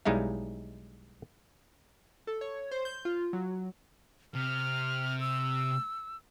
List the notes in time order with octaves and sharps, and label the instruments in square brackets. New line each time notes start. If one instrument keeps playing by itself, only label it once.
[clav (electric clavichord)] B1 G3 G#3 D#4 E4 F5
[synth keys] A4
C#5
C5
G6
F4
F#3
[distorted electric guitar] C3 [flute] F6
[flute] E6